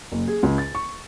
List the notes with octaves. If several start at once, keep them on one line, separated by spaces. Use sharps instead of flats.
F#1
G#4
C#2
A6
C#6